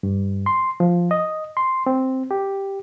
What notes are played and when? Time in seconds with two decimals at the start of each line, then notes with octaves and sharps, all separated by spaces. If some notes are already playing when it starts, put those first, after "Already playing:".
0.03 G2
0.46 C6
0.80 F3
1.11 D#5
1.57 C6
1.86 C4
2.31 G4